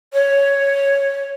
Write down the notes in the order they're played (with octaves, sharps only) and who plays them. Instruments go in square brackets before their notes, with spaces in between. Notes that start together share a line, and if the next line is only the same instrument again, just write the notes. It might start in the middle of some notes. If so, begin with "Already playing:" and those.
[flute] C#5